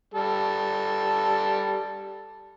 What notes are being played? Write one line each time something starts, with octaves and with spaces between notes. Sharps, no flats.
G3 A4